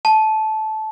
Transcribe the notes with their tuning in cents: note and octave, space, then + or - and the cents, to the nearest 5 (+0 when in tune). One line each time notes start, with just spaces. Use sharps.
A5 -15